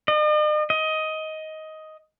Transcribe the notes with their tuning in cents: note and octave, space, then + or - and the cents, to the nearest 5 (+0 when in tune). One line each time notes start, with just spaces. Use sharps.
D#5 -45
D#5 +15